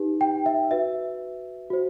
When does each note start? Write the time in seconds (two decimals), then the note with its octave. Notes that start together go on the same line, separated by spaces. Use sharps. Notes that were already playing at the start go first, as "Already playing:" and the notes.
Already playing: D#4 G4 B4
0.21 G5
0.46 E5
0.71 F#4 B4 E5
1.70 F#4 C5